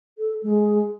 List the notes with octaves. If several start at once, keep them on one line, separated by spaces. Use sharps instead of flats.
A4
G#3